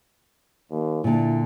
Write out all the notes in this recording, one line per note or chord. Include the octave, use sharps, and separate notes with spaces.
D#2
A#2 D3 E4